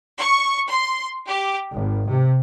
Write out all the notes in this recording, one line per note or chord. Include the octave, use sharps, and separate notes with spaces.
C#6
C6
G4
G#1
C3